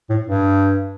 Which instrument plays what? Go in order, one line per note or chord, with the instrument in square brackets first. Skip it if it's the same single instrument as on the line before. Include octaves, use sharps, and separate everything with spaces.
[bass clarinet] A2
G2